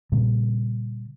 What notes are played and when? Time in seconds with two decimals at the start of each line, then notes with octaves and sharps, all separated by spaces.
0.12 A#2 C#3 G3 A#3